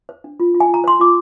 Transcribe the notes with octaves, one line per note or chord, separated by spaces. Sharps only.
C5
D4
F4
F4
G#5
F4 A#5
C5 C6
F4 D6